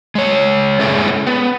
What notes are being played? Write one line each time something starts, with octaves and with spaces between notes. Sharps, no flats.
G#3 C#5
G#3 A3 C#4 E4 G#4 A4
B3